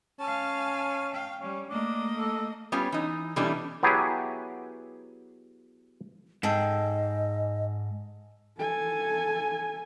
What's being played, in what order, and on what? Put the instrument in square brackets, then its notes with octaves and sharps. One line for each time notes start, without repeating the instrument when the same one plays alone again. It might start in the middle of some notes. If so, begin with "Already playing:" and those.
[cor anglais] C#4 [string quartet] F5 G#5 A5
[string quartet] F5 G5
[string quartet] G3 [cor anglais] C#4
[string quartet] A3 A#3 D#5 [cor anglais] D4
[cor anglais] A4
[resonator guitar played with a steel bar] G3 B3 C#4 F4
E3 D#4
B2 E3 G3 A3 C#4 D4
[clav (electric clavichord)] F#3 B3 E4 G4 G#4
[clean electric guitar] G#2 [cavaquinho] G#4 A4 G5 [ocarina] D#5
[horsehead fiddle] A4 G#5